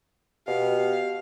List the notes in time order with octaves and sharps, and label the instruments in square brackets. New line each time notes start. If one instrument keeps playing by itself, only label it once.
[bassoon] B2 [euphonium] G4 [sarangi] F5